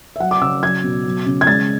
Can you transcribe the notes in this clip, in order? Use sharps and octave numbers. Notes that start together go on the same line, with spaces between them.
E5
F#3 F#5
D6
C#3 E6
F#3 G#6
B2
F#3
C#3
G#6
G#3 A6